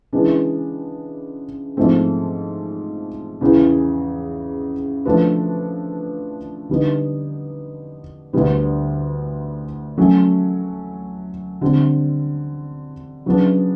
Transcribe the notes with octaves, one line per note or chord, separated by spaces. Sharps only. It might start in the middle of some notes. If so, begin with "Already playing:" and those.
C#3 E3 G#3 B3 D4
G#2 F3 A3 C4
E2 C#3 E3
F3 A3 D4 F#4 B4
D3 G3 B3 D#4
D2 D3 G3 B3
F#3 A3 C#4
D3 G3 C4
C#3 F#3 B3 D4